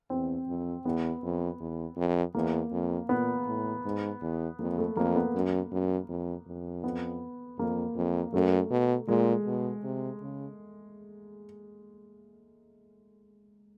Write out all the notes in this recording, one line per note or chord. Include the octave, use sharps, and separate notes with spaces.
E2 C4
F2
E2 B3
F2
E2
F2
E2 A#3
F2
A#2 B3
A2
G#2
E2
F2 A#3
A3
F2 A#3
B3
F#2
F#2
F2
F2
B3
F2 A#3
F2
F#2 A3
B2
A#2 G#3
B2
C3
C#3